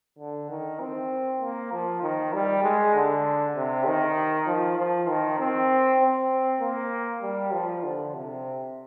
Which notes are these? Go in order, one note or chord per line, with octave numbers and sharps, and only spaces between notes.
D3
D#3
C4
A#3
F3
D#3
G3
G#3
D3
C3
D#3
F3
F3
D#3
C4
C4
A#3
G3
F3
D3
C3